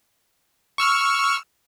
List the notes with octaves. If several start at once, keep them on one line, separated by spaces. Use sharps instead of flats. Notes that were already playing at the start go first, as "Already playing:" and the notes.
C#6 E6 F6